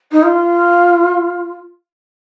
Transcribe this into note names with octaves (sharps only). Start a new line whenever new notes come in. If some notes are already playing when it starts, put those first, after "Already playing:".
D#4
F4